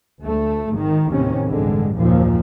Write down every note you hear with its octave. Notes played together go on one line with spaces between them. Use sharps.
D2 A3
G#1 D#3
D#2 A2 C3 D#3 C#4
A1 G2 D3 G#3
F#1 D#2 A#2 F3